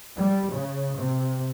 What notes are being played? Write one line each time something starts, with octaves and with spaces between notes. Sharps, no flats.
G3
C#3
C3